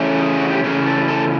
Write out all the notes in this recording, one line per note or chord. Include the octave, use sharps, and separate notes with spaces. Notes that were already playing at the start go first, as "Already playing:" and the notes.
Already playing: C#3 E3 A3 C#4
G#4
F#4
G4
C#3 E3 A3 C#4 G#4
A4
A4